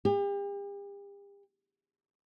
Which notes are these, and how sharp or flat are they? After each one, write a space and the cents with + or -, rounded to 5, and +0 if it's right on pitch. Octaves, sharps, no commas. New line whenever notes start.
G4 +40